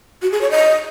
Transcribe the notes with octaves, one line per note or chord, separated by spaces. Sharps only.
F#4
G#4
C#5
D#5